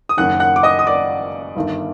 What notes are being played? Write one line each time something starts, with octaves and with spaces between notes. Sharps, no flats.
D#6
F#1 F#2 D#3 F#5 F#6
F#5 F#6
D6
D#5 D#6
D#6
D5 D6
G1 G2 D#3